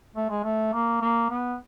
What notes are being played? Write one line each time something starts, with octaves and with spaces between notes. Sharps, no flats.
A3
G#3
A3
A#3
A#3
B3